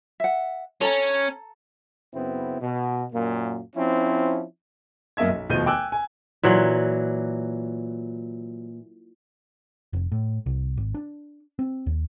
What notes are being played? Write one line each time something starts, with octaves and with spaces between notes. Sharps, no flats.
E5 F#5
C#4 A4 A#5
F#2 C#3 B3 C4 E4
B2
F#2 A#2 A#3
F3 C4 C#4 E4
F#2 A#3 D#5 E5 G#6
B1
F1 D#2 B2 F3 G6 D#7
G5 G#5 D6 E6 F#6
G#5
A#2 E3 F#3
F1
A2
C2
G#1
D4
C4
D#2